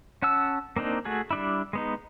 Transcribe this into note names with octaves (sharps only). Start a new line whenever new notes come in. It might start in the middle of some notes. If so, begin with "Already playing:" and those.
C#4 F#5 A5 E6
A#3 C4 D4 D#4
A3 F#4 G#4
G3 D4 E4
G#3 B3 D#4